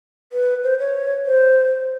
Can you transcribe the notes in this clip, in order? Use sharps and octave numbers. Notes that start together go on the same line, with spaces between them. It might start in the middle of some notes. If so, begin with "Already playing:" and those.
B4
C5
C#5
C5